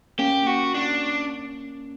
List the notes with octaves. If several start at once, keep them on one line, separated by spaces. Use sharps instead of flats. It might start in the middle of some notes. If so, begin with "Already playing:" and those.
A#3 C#4 G4
F#4
D4